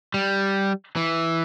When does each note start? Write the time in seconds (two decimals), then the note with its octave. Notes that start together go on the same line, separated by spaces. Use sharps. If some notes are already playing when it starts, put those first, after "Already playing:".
0.14 G3
0.96 E3